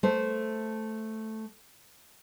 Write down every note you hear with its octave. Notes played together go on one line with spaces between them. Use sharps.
A3 C5